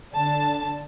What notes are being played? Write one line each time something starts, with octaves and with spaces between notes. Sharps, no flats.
D3 D4 A5